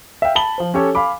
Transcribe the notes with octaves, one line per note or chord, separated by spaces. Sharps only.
E5 F5 G5
A5 B5 F#7 G7
F3 C5
C#4 G4 A4 C#5
F5 G#5 B5 D6